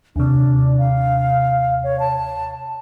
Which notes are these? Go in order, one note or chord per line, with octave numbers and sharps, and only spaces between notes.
D#2 C3 D4
F5
C#5
A5